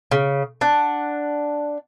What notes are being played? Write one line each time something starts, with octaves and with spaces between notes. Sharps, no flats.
C#3
D4 F#5